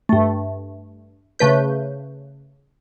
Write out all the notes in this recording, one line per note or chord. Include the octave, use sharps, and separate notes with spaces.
G2 A3
C#3 A3 B4 G6